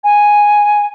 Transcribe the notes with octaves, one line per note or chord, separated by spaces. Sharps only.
G#5